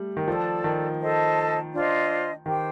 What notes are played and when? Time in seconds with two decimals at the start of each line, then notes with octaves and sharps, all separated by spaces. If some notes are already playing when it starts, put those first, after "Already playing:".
Already playing: G3 A3
0.17 D#3
0.28 F3 A4 D5 A5
0.64 D#3
1.01 A4 C5 D#5 A5
1.73 D4 F4 C5 D#5
2.46 D#3 G4 C5 G5